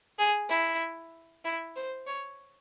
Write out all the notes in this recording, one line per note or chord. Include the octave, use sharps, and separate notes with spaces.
G#4
E4
E4
C5
C#5